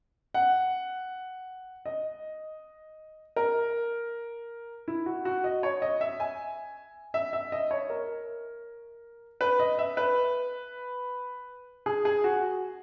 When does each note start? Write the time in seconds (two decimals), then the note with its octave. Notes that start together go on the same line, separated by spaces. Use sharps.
0.34 F#5
1.86 D#5
3.36 A#4
4.88 E4
5.06 F#4
5.25 F#4
5.44 D#5
5.63 C#5
5.82 D#5
6.01 E5
6.20 G#5
7.14 E5
7.33 E5
7.52 D#5
7.71 C#5
7.90 A#4
9.41 B4
9.59 D#5
9.79 E5
9.97 B4
11.86 G#4
12.05 G#4
12.24 F#4